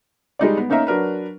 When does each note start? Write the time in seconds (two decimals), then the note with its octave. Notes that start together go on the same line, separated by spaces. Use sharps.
0.39 G3 G#3 D#4 D5
0.57 B3
0.69 A#3 C#4 D#4 A#4 E5 A#5
0.87 F#3 D4 A#4 B4